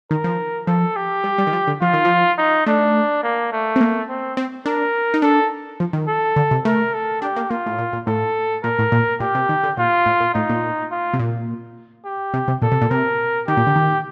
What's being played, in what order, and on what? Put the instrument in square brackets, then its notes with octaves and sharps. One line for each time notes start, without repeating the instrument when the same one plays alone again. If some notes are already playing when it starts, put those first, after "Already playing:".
[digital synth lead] D#3 [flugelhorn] A#4
[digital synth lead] F3
[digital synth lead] F3 [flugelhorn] A4
[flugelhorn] G4
[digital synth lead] G3
G3
D#3
F3
D3
[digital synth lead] F3 [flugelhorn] F4
[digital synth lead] D#3
F3
[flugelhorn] D#4
[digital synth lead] A3 [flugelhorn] D4
[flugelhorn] A#3
A3
[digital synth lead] C4
A#3
[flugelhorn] C4
[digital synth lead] C4
[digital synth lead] D4 [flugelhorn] A#4
[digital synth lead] D#4
[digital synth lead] D4 [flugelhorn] A4
[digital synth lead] F3
D#3
[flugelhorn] A4
[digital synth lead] D3
C3
[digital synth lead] A3 [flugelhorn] A#4
[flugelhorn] A4
[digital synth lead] D4 [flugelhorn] G4
[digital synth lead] A#3
[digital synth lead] A#3 [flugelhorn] F4
[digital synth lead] A2
A#2
A#2
[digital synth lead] A2 [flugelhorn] A4
[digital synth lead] A#2 [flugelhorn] A#4
[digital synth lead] A2
A#2
[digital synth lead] A#2 [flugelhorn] G4
[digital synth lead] C3
D#3
D3
[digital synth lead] A#2 [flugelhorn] F4
[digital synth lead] A2
A#2
[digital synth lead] A2 [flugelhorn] D#4
[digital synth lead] A#2
[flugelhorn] F4
[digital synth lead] C3
A#2
[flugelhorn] G4
[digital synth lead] C3
C3
[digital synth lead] A#2 [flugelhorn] A4
[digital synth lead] C3
A#2
[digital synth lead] C3 [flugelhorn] A#4
[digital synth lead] D#3 [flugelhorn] G4
[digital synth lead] A#2
D3
D#3